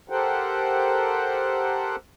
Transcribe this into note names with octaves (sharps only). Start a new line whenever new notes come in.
G4 A4 A#4 C5 F#5 G5